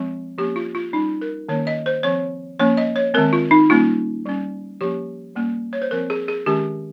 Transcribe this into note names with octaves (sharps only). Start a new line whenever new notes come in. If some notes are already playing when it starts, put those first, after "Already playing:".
Already playing: F3 G#3 C4
F3 A#3 C#4 G4
F4
F4
G3 C#4 D#4
A#4
D#3 A#3 C#4 C#5
D#5
C5
F3 C4 C#5
F3 A#3 C#4 C#5
D#5
C#5
D#3 G#3 C4 A#4
F4
D#4
G3 A#3 C#4 F4
G3 C#4
F3 A#3 C#4 G4
G3 A#3 C#4
C#5
C5
F3 C4 A#4
G#4
G#4
D#3 G#3 C#4 G4